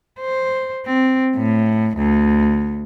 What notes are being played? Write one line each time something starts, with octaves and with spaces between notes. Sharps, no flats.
C5
C4
A2
D2